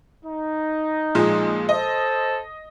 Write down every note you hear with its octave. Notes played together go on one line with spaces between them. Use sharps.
D#4
A#2 F3 G#3
A4 C5 D#5